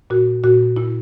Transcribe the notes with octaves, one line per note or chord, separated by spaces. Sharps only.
A#2 F#4
A#2 F#4
A#2 E4